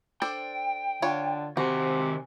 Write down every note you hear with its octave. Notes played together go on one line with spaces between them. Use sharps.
D4 A4 C5 G5
D3 F4 C#5
C3 D#3 F#4 G#5